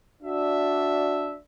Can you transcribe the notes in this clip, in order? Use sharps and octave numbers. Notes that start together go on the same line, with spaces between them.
D4 F#4 D5 E5